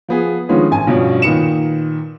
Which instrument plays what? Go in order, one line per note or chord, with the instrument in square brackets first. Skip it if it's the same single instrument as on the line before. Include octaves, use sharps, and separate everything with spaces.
[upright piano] F3 B3 G#4
D3 D#3 F3 G#3 B3 C#4
A1 G#5 A5
G2 B2 F3 C#4 D4
A#2 D#3 D#4 B4 C#7 E7